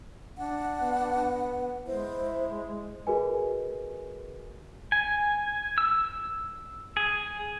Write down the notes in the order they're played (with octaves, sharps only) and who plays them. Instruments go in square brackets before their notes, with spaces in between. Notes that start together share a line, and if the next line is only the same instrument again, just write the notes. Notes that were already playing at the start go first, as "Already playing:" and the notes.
[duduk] D4 [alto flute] F#5
[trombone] B3
[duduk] G#3 [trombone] E4 [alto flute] C5
[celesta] F#4 G#4 A#4 B4 D#5 G#5
[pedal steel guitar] G#5
E6
G#4